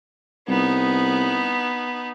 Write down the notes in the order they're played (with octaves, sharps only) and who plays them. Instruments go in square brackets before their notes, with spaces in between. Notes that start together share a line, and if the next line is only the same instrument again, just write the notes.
[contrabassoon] C2 [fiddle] B3 D#4